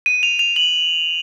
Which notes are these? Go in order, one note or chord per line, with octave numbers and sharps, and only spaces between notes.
D#7
F7
F7
F#7